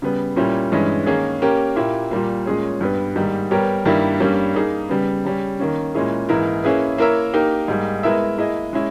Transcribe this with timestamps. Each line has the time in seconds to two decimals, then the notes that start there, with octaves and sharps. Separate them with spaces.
0.02 C#3 G3 B3
0.36 A#2 G3 C#4 E4
0.72 G2 E3 G#3 C#4
1.06 D#3 A#3 C#4 G#4
1.42 A#3 C#4 G4 A#4
1.76 A#2 A#3 E4 G4
2.11 A#2 G3 A#3
2.46 A#2 G#3 C#4 G#4 C#5
2.81 G2 G3 B3
3.16 G#2 D#3 G3 A#3
3.51 G3 B3 G4 A#4 C#5
3.85 G2 D#3 G3 A#3 E4
4.20 G2 G3 A#3 C#4
4.54 A#3 D#4 G#4
4.89 C#3 G3 B3
5.25 C#3 G3 C#4
5.60 D#3 A#3 C#4
5.94 A#2 G#3 C#4 E4 G#4
6.29 G#2 E3 A#3 E4 A#4
6.64 A#3 C#4 E4 G#4 B4
6.98 A#3 E4 A#4 C#5 E5
7.33 A#3 D#4 G4 A#4
7.68 G#2 G3 A#3
8.03 G#3 B3 E4 A#4 E5
8.38 A#3 E4 G#4 D#5
8.73 G#3 C#4 E4